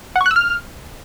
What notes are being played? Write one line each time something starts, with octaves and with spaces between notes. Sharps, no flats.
F#5
C#6
F#6
E6
F6